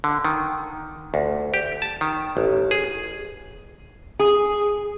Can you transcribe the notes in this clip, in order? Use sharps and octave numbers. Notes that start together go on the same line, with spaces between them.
D3
D#3
D2
G4
A5
D#3
A1
G#4
G#4